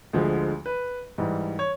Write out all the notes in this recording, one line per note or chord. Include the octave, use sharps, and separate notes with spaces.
D2 D3 F3 G#3
B4
G#2 E3 G3
C#5